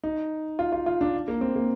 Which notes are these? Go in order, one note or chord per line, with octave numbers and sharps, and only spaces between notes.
D#4
F4
F4
F4
D4
A#3
C4
A#3